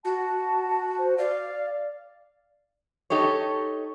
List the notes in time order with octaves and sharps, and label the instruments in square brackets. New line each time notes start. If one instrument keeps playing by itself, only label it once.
[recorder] F#4 [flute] A5
[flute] C5
[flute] D5 [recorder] F5
[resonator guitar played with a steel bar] D#4 G4 A4 C#5